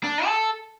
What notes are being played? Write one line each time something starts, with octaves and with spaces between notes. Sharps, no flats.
D4
A4